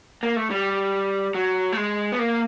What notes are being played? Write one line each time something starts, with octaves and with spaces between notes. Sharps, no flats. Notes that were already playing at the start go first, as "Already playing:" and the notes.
A#3
A3
G3
F#3
A3
G#3
B3
A#3